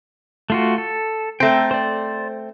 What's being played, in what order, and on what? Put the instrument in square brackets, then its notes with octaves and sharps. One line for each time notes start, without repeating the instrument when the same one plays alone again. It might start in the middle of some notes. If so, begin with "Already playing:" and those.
[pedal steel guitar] A3 F4 F#4
A4
[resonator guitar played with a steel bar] A3 C4 [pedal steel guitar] G5 A#5 E6
[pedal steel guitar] C5 D5